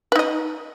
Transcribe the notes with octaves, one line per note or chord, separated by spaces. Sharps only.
D#4 B4 D#5